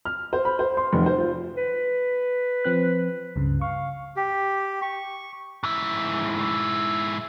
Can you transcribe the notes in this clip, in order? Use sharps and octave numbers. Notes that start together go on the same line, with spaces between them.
F6
C5
B5
C5
C6
F1
C5
F4
B4
F3 C4 F#6
C#2 G2 C#3
F5 C#6
G4
C#6
G#2 E4